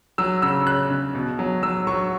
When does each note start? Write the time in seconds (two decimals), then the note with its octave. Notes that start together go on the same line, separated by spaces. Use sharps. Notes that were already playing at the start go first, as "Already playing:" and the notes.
0.18 F#3 E6
0.42 C#3 E6
0.66 C#3 F#6
0.90 C#3
1.15 B2
1.39 F#3
1.63 F#3 E6
1.87 F#3 C#6